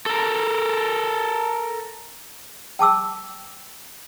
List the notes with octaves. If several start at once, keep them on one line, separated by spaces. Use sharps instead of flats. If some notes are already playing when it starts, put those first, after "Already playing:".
A4 A#4
G5 A5 D6 E6